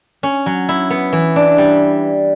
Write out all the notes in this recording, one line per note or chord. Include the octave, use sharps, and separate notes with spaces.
C#4
F#3
E4
B3
E3
D4
G3